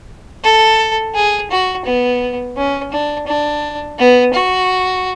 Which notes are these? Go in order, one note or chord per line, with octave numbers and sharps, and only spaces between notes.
A4
G#4
F#4
B3
C#4
D4
D4
B3
F#4